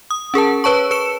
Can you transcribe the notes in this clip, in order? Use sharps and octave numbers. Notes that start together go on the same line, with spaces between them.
D#6
C#4 G#4 A#4 A5
B4 C#5 A5 C#6
B4 C#7 E7